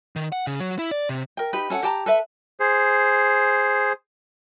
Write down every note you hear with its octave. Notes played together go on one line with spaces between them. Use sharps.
D#3
F#5
C#3
F#3
E4
D5
C3
A#4 G5
D#4 G4 B4
C#4 A4 F#5
G4 G5 A5 A#5
A4 B4 E5
G#4 C5